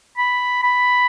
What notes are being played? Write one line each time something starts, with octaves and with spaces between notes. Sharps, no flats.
B5
B5